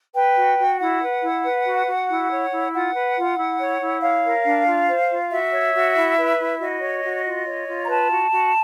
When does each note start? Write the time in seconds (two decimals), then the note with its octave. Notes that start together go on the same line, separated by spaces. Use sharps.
0.14 B4 G5
0.36 F#4
0.58 F#4
0.80 E4 F#5
1.01 B4
1.23 E4
1.43 B4
1.66 F#4
1.88 F#4
2.08 E4
2.30 C#5
2.52 E4
2.73 F4 F#5
2.94 B4
3.15 F4
3.38 E4
3.59 C#5
3.81 E4
4.02 C#5 F5
4.23 A#4
4.44 D4
4.66 F4
4.88 C5
5.10 F4
5.30 F#4 E5
5.52 C#5
5.73 F#4
5.95 E4
6.17 B4
6.39 E4
6.60 F#4 D#5
6.81 C#5
7.03 F#4
7.25 F4
7.46 C#5
7.67 F4
7.83 A#5
7.89 B4 A5
8.10 F#4
8.32 F#4